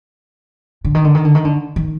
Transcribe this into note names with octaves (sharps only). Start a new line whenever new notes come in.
D3
D#3
D3
D#3
D3
D#3
D3
D#3